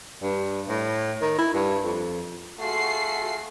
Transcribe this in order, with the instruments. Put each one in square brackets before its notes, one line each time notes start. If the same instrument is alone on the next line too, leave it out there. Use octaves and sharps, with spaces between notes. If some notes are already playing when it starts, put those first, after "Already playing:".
[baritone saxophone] G2
A2
D#3
E4
G2
F2
[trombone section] A3 F4 G#4 [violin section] F#4 C7